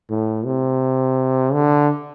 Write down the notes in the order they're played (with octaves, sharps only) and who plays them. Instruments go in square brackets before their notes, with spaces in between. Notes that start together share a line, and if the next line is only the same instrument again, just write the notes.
[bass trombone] A2
C3
D3